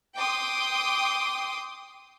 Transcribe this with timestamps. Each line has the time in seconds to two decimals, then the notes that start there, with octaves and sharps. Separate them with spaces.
0.16 G5 C6 D6 D#6